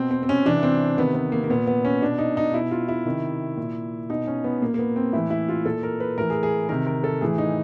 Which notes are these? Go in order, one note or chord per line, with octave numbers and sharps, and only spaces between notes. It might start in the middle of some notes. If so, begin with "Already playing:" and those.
Already playing: B2 C4
C4
C4
C#4
C3 E3 D4
C4
C3 D#3 B3
B3
A#3
A#3
A#2 B3
B3
C#4
B2 D4
D#4
D#4
B2 E4
F4
E4
C3 D#3
A#2
B2 D#4
C#4
B3
A#2 A#3
A#3
B3
C4
A2 E3 E4
E4
F4
A#2 A4
A#4
B4
A2 E3 A#4
G#4
G#4
C3 D#3 A#4
A#4
A4
A2 E3 G#4
D#4